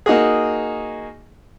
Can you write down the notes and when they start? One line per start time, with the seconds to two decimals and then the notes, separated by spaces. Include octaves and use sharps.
0.06 A#3 D#4 F#4 G#4